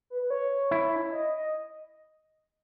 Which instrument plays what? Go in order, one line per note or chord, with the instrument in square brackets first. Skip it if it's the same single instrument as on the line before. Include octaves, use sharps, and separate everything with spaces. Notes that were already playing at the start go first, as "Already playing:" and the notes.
[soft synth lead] B4
B4
C#5
[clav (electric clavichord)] E4
[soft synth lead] D#5
D#5